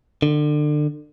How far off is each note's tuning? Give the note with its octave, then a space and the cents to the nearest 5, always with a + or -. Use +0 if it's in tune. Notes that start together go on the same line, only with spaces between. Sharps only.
D3 +30